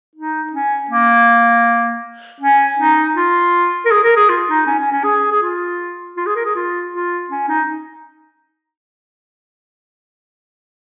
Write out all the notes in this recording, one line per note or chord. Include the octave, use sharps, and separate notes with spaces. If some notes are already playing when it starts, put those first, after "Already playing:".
D#4
C#4
A#3
C#4
D#4
F4
A#4
G#4
A#4
G#4
F4
D#4
C#4
C#4
C#4
G#4
G#4
F4
F4
G#4
A#4
G#4
F4
F4
C#4
D#4